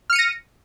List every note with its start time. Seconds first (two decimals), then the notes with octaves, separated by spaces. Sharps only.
0.10 F6
0.13 C#7
0.16 D#7
0.19 A#6